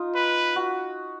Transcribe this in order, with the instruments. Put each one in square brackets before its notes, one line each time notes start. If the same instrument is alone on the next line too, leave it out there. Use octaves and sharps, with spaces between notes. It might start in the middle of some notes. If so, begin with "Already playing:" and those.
Already playing: [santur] D#4 F4
[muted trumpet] B4
[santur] F#4